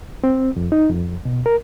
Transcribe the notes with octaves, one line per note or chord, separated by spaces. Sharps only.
C4
F2
D#4
F2
B2
A#4